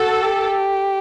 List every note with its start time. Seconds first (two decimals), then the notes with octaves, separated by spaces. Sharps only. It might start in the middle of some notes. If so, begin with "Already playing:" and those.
Already playing: F#4 A4
0.22 G4